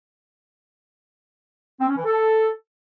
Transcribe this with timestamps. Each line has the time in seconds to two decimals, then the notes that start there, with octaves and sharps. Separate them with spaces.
1.80 C4
1.89 C#4
1.97 E3
2.05 A4